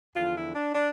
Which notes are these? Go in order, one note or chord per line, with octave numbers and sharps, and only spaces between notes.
E2 D3 F3 F4
E4
D4
D4